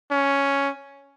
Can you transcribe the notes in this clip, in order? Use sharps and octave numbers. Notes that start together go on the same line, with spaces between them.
C#4